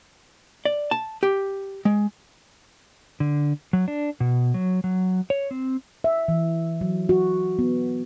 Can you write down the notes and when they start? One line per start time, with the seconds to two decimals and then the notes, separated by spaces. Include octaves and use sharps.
0.65 D5
0.91 A5
1.23 G4
1.85 G#3
3.20 D3
3.73 F#3
3.88 D4
4.20 B2
4.54 F#3
4.84 F#3
5.30 C#5
5.51 C4
6.04 E5
6.28 E3
6.81 F#3
7.09 F#4
7.59 B3